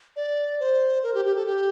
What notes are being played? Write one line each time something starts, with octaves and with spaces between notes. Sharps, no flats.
D5
C5
A#4
G4
G4
A4
G4